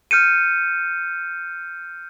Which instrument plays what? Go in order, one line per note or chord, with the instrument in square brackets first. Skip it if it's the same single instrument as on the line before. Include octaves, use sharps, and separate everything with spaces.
[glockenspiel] F6 G6 C#7 D#7